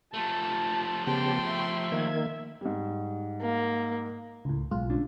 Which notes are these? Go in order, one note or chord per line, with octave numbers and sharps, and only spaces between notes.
F3 A3 A5
C#3 B3 G4 G5 C6
E5 B5 C#6
D#3 A#3 G#6
G#2 G3
A#3
C#2 A2
B1 A2 G#3 F4
D2 C#4 D4